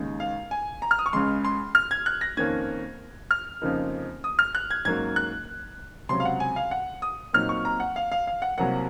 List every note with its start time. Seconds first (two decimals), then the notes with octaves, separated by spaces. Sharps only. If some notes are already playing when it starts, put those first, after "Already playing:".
Already playing: D#2 C#3 G#3 D#4
0.20 F5
0.51 G#5
0.82 A#5
0.91 F6
0.99 D#6
1.06 C#6
1.13 C#2 C#3 G#3 C6
1.45 C6
1.75 F6
1.91 G#6
2.06 F#6
2.21 A#6
2.37 F2 D#3 A#3 C#4 G#6
3.31 F6
3.62 F2 C#3 F3 A#3 D#4
4.24 D#6
4.39 F6
4.55 F#6
4.71 G#6
4.85 G#2 F#3 A#3 C#4 G#6
5.16 F#6
6.09 C#2 C3 F#3 C6
6.20 F5
6.25 F#5
6.40 G#5
6.56 F5
6.71 F#5
7.02 D#6
7.33 A#2 F#3 C4 D#4 F6
7.49 C#6
7.65 A#5
7.80 F#5
7.96 F5
8.12 F5
8.27 F5
8.42 F#5
8.58 C2 C3 F#3 A#3 F#5